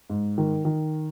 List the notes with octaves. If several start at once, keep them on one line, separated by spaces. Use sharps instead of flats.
G#2
D#3
D#3